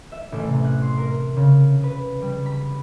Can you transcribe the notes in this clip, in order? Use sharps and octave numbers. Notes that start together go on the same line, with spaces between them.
E5
A1
C3
F#6
C6
A#4
C#3
B4
G3
B5